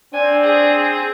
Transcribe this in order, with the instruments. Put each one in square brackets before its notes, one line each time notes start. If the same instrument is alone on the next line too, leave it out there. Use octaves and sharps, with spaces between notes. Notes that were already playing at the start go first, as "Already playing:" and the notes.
[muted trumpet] C4 [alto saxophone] D4 [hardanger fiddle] G#5
[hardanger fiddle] G#4